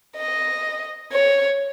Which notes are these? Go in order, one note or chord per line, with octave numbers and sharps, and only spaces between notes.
D#5
C#5